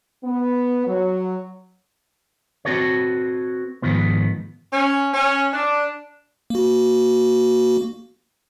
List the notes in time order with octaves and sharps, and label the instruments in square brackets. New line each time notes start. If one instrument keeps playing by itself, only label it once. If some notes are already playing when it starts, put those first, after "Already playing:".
[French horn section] B3
F#3
[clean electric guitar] C4 F#4 A4 B4 C#5
G#2 D#3 F3 B3
[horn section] C#4
C#4
D4
[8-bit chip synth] A#3 F#4